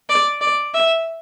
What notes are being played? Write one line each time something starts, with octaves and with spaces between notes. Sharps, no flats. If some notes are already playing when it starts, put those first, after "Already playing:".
D5
D5
E5